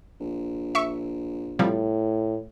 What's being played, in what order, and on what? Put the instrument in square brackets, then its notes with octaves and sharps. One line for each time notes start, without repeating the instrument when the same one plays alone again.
[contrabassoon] A#1
[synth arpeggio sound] E5 C#6
[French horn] A2 [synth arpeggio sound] C3 F3 G3